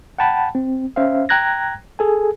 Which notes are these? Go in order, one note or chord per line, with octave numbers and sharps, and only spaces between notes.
F#5 G5 A5 B5
C4
C#4 C5 E5 F5
G5 A#5 F#6 G#6 A#6
G#4 A4 G#5